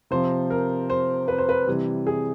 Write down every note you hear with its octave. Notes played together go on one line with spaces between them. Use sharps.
C3 F3 C5
A#4
C5
B4
C5
B4
C3 E3 G3
G#4